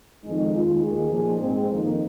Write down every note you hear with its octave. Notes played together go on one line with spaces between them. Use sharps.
F2 D#3 G#3 D#4
D#2 D#3 G#3 F4
D#2 D#3 A#3 G#4
A#2 F3 A#3 D#4 G#4
G#2 G#3 C4
F2 D#3 A#3 D#4